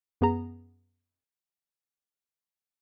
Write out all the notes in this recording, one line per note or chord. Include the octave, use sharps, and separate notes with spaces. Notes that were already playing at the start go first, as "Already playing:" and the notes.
F#2 B3 G#4 A#5